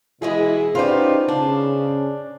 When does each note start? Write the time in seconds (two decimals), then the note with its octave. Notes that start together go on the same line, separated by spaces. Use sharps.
0.22 B2 E3 G#3 B3 E4 G#4
0.75 B3 C#4 D#4 F4 G4 B4 C5 D5
1.29 C#3 D4